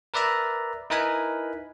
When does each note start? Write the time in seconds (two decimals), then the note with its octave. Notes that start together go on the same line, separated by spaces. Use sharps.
0.14 A#4 B4 D5 E5 A#5
0.90 D#4 E4 A#4 B4 G#5 B5